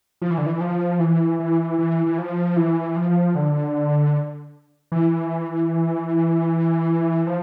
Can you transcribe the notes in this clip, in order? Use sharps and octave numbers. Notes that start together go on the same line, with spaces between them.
F3
E3
D3
E3
F3
E3
E3
E3
E3
F3
E3
F3
D3
E3
F3